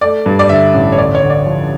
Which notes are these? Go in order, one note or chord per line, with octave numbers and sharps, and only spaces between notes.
A3 D5
G2
D5
D3 E5
A1
C#5
D2 D5
C#5
D3
D5
F3